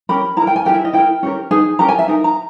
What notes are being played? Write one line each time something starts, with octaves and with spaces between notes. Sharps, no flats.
C#4 G4 A#4 B5
E4 A#5
A#4
G5
G#5
E4 G4 A#4 G5
E5
D#5
E4 A#4 G5
C#4 G4 A#4
D#4 G#4 B4 G#5
C#4 G4 A#4 A#5
G#5
E5
D#4 A#4
A#5